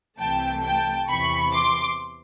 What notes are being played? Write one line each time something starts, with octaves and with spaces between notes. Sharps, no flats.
C2 C3 E3 A3 G5 A5
G5 A5
E2 C3 E3 B5 C#6
C6 D6